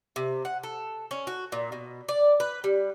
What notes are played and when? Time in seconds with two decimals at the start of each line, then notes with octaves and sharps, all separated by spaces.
0.16 C3
0.45 F#5
0.63 A4
1.11 C#4
1.27 F#4
1.52 A#2
1.72 B2
2.08 D5
2.40 B4
2.64 G3